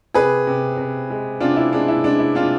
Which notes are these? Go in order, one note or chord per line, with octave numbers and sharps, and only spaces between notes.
C3 G#4 B4
C3
C3
G#3
C3 D4 F4
E4
G#3 D4
E4
G#3 D4
E4
C3 D4 F4